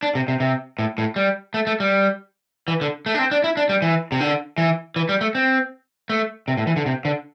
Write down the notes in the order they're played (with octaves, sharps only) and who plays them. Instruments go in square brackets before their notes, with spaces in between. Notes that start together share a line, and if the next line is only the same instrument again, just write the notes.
[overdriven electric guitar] D4
C3
C3
C3
A2
A2
G3
A3
A3
G3
E3
D3
A3
D4
C4
D4
E4
D4
G3
E3
C3
D3
E3
E3
G3
A3
C4
A3
C3
A2
E3
D3
C3
D3